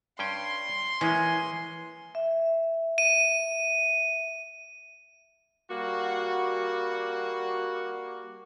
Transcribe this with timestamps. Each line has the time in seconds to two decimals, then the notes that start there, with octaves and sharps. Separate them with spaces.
0.19 G2 C#4 G5 C6
1.01 E3 G#3 A#3 C#4 G#5
2.15 E5
2.98 D#7
5.71 G3 A#3 F#4